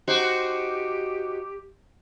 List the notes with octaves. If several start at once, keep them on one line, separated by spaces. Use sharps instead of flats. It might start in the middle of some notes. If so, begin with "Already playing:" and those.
D#4 F#4 G4 C5